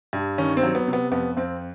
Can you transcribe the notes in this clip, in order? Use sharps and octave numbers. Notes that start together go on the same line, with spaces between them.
G2
D#3 C#4
C4
F#3
B3
C3
B3
F2 B3
F2 C4